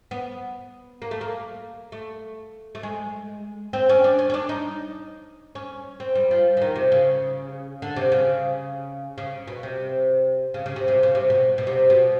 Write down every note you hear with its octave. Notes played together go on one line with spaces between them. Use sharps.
B3
A#3
A3
A#3
A3
A3
G#3
C4
C#4
D4
C#4
C#4
D4
D#4
C#4
C4
G3
F3
E3
D#3
C3
C#3
D3
C3
C#3
C#3
B2
C3
C#3
C#3
C3
C3
C#3
C3
B2
B2
C3
B2